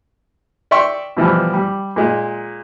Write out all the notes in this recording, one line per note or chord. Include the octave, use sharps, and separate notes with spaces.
D5 E5 G5 C6 C#6
B2 E3 F3 G3
G3
A#2 G#3